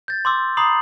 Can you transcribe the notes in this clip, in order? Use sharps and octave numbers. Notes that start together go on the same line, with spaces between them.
G6 A6
C6 D6 E6
A#5 B5 D6 D#6 C7 F#7